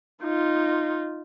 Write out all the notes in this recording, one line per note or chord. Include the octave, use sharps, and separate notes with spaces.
D#4 F4